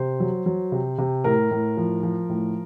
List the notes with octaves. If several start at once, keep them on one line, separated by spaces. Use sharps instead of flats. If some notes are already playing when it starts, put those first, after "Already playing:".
Already playing: C3 C5
F#3
F#3
C3
C3
A2 A#4
A2
F3
F3
A2